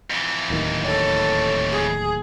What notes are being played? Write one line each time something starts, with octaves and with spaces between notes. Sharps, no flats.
F2 E3
D1 D#2 D#3
A4 C#5
G#4